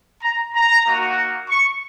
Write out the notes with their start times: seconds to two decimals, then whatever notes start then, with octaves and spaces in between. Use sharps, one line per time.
0.22 A#5
0.54 A#5
0.86 A#3 D#4 F#4
1.49 C#6